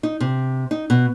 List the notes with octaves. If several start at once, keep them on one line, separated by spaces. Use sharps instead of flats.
D#4
C3
D#4
B2